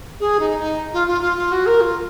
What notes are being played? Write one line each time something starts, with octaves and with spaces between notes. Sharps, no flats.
G#4
D#4
D#4
F4
F4
F4
F4
F#4
A#4
F4